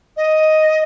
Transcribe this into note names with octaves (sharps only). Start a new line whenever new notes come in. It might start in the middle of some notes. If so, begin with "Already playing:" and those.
D#5